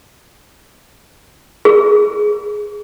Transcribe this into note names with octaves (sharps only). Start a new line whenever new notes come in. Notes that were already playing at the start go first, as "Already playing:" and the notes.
G#4